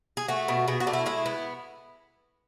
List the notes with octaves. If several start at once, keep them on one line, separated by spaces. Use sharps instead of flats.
G#4
A3 F#4
B2
B2 G#4
F#4
A3 D4
E4
G#3 E4
B3